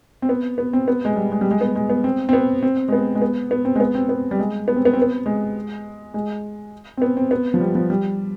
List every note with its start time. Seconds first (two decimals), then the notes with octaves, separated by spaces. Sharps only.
0.22 C4
0.29 B3
0.58 B3
0.73 C4
0.88 B3
1.05 G#3
1.16 G3
1.32 G#3
1.41 G3
1.51 G#3
1.61 B3
1.76 G#3
1.90 B3
2.04 C4
2.29 C4
2.33 B3
2.63 C4
2.88 G#3
2.93 B3
3.15 G#3
3.22 B3
3.51 B3
3.65 C4
3.76 G#3
3.80 B3
3.95 C4
4.09 B3
4.31 G3
4.39 G#3
4.68 B3
4.76 C4
4.85 B3
4.93 C4
5.02 B3
5.26 G#3
6.14 G#3
6.97 C4
7.02 B3
7.17 C4
7.31 B3
7.54 F3
7.60 G3
7.75 F3
7.90 G3